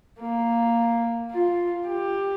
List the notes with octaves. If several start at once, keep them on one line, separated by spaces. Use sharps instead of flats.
A#3
F4
G4